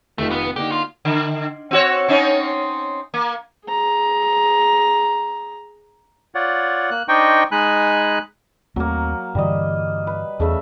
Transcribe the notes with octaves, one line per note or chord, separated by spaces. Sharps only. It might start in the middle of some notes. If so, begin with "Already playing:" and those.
F1 D#3 A3 F4
B3
D3 A#3 D#4 G4
F4
D3
C4 F#4 C#5
C4 C#4 D#4
A#3
G#4 A#5
F4 C#5 D5 F#5
A#3 F#6
D4 D#4 C5 D#5 G5 C#6
G#3 D#4 G#5 B5 F#6
D#2 F#3 A3 A#3 C4
G2 D3 E3 G3 D#5
B4
E2 C#3 A3 E5